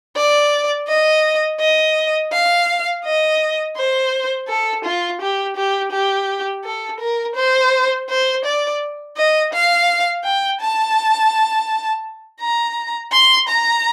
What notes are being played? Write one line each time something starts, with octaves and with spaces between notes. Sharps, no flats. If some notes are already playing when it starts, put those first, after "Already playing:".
D5
D#5
D#5
F5
D#5
C5
A4
F4
G4
G4
G4
A4
A#4
C5
C5
D5
D#5
F5
G5
A5
A#5
C6
A#5